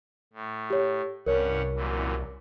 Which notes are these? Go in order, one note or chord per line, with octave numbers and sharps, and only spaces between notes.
A2
G4 C#5
C2 G2 C#4 A#4 C#5 F#5
F#2 A#2 E3